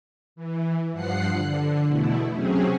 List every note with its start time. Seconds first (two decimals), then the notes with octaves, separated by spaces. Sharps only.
0.36 E3
0.92 G2 F3 F#5 F#6 C7
1.34 D3
1.88 E2 B2 A3 E4
2.32 C3 F#3 C4 C#4 G#4